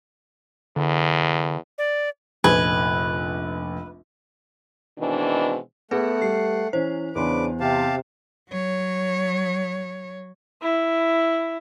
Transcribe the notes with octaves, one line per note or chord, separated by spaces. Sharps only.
E2 D3
D5
F1 A#1 B4 G#5
B2 D#3 E3 G#3 C4 D4
A3 B3 G#4 A4 B4 F#5
G3 C7
E3 C#4 C5
E2 C#3 D4 B4 C6 D6
C3 G4 F5 A5
F#3 C#5
E4